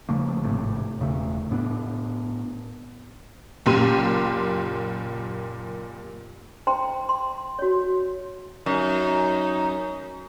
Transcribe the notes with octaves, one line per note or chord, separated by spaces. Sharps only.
C#3 F3 A3 A#3
G#1 A2 C3
E1 C#3 A3
A2 B3 D4
F#1 A#2 G4 C6 D#7
C5 G5 A#5 C6
C6
F#4 C#5
F#2 D#4